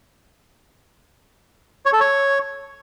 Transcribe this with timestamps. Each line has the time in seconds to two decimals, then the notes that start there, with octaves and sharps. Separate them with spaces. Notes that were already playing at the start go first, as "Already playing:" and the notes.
1.86 C#5
1.93 A4
2.00 C#5